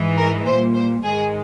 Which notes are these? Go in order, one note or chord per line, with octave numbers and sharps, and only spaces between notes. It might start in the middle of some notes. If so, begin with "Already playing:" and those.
Already playing: G#2 E3 G#3
A#4
A#2 G3 C5
C5
G#2 D#3 G#3 G#4